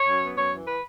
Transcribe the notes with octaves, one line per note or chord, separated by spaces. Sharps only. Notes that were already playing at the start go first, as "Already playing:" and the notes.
Already playing: C#5
F#2
B3
F#2 C#5
E3
B4